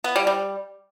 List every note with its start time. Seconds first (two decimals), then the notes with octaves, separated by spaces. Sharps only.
0.04 B3
0.16 G3
0.27 G3